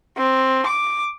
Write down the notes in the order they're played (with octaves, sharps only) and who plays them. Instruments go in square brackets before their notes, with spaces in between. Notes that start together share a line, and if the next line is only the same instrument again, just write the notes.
[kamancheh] C4
D6